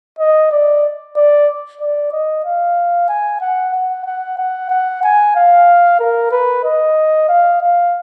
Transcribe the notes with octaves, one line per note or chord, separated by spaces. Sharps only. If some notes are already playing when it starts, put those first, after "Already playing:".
D#5
D5
D5
D5
D#5
F5
G#5
F#5
F#5
F#5
F#5
F#5
G#5
F5
A#4
B4
D#5
F5
F5